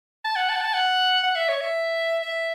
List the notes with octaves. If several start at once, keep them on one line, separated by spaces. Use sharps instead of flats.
A5
F#5
A5
F#5
A5
F#5
F#5
E5
C#5
E5
E5